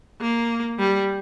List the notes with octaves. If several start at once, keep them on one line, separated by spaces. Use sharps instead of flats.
A#3
G3